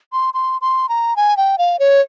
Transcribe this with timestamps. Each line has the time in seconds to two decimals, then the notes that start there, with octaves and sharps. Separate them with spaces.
0.13 C6
0.34 C6
0.61 C6
0.89 A#5
1.16 G#5
1.37 G5
1.58 F5
1.79 C#5